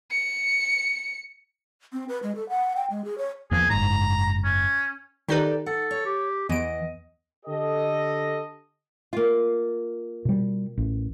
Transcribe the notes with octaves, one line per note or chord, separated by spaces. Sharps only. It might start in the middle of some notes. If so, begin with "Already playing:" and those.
C#7
C4
B4
G#3
A4
F#5
G5
G#3
G#4
C#5
E2 F3 A#3 G#4
F#1 G#2 A#5
C#4
D#3 D#4 G4 A4 B4 D5
A4 F#5
C#5
G4
E2 E3 D#5 F#5 D7
D3 G4 A4 D#5
A#3 F4
B2 G3
A1